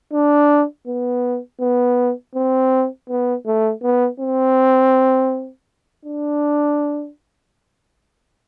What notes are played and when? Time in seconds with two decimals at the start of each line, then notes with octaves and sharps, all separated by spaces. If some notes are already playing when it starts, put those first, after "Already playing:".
0.12 D4
0.87 B3
1.60 B3
2.35 C4
3.09 B3
3.46 A3
3.83 B3
4.20 C4
6.05 D4